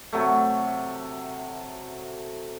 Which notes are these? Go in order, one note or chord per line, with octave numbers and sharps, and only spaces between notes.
C3 F#3 A3